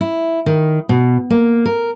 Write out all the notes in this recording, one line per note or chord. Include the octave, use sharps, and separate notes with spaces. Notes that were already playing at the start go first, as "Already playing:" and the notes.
E4
D#3
B2
A#3
A#4